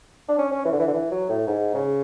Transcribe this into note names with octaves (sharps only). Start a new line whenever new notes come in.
D4
C#4
C#4
E3
D3
E3
D3
E3
F#3
A2
G#2
C#3